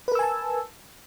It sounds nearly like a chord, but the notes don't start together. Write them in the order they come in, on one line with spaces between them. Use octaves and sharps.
B4 A#4 E6 G#5 A5